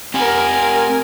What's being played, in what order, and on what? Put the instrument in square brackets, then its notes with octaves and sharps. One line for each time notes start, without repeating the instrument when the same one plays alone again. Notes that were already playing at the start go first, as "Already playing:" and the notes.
[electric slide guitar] C4 G4 F#5 [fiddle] A#4 G#5